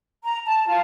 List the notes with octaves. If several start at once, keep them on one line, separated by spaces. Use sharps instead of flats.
A#5
A5
F4